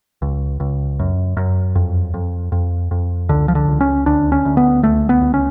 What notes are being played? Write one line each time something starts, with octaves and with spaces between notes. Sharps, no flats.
C#2
C#2
F#2
F#2
F2
F2
F2
F2
C#2 D3
F3
D3
C#2
C#4
D2 D4
C#4
D2
B3
C#2 A3
B3
C#2
C#4